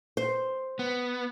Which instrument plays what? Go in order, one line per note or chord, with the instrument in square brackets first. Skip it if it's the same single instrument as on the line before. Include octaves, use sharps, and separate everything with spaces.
[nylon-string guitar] C5
[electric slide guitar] B3